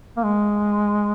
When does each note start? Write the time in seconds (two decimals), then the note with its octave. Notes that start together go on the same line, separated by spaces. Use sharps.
0.17 A#3
0.24 G#3